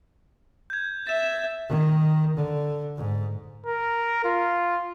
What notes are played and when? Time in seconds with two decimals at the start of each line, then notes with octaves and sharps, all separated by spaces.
0.70 G6 G#6
1.07 E5 A6 E7
1.69 D#3
2.36 D3
2.97 G#2
3.67 A#4
4.25 F4